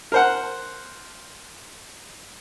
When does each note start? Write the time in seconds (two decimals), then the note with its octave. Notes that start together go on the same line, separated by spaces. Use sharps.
0.12 A#4 C5 F#5